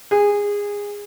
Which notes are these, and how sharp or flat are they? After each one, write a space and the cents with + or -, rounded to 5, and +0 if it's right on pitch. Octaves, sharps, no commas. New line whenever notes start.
G#4 -20